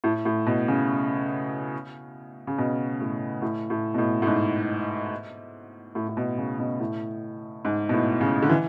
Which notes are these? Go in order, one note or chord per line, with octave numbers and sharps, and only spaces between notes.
A2
A2
B2
C#3
C#3
B2
A2
A2
A2
B2
A2
A2
G#2
A2
A2
B2
C#3
B2
A2
G#2
B2
A2
C#3
D3
E3